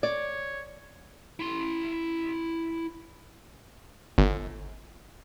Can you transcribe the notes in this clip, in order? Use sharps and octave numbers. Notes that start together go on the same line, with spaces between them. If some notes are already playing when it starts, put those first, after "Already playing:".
C#5 D5
E4 C6
G1